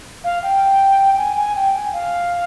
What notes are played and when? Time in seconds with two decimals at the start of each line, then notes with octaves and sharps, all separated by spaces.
0.24 F5
0.43 G5
1.17 G#5
1.36 G#5
1.55 G5
1.74 G#5
1.93 F5